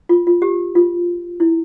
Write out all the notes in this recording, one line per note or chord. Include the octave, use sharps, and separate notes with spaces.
F4
F4
G4
F4
E4